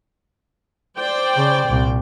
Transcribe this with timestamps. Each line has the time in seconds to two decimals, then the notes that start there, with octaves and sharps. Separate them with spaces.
0.96 C5 D5 G5
1.36 C#3
1.67 C2 A#2